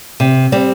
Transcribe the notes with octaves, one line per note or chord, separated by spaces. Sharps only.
C3
G3 C4